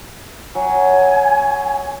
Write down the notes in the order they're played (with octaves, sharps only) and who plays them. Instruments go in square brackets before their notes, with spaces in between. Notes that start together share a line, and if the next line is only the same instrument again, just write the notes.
[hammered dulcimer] F#3 [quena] G#5